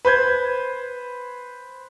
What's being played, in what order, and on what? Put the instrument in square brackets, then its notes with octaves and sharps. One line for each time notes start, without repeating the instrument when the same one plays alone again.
[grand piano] B4 C5 G6 G#6